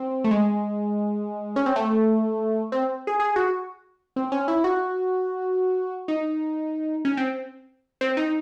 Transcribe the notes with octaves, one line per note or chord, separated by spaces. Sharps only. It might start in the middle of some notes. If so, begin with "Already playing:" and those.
Already playing: C4
A3
G#3
C#4
C4
A3
C4
G#4
G#4
F#4
C4
C#4
E4
F#4
D#4
C#4
C4
C4
D#4